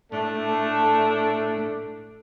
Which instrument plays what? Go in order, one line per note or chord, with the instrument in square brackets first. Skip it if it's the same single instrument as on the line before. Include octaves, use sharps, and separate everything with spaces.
[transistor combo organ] A2 [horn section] A3 D4